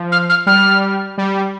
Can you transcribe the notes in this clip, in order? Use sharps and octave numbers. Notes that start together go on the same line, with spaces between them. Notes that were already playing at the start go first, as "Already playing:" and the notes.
Already playing: F3
F6
F6
G3 F6
G3